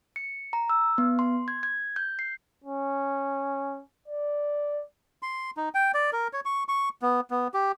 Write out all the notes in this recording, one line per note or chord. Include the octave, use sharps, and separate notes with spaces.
C#7
A#5
E6
B3
C6
G#6
G#6
G6
C7
C#4
D5
C6
D#4
G5
D5
A#4
C#5
C#6
C#6
B3
B3
G4